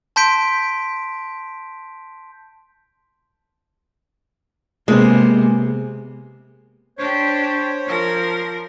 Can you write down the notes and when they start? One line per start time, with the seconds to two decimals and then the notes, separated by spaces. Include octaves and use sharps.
0.16 A5 C6 G6 B6 D7
4.88 C3 G#3 A#3 B3
6.98 D4 G4 C5 C#5
7.87 F3 A#4